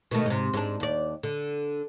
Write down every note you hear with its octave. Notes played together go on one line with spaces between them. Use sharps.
B2 D#3 A3
G#2 C3
G#2 D4
D#2 D5
D3